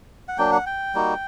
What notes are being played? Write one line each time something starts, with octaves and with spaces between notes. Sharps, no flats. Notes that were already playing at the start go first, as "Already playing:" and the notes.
F#5
F#3 A#3 D4 G5
F#5
G5
G3 A#3 D#4 F#4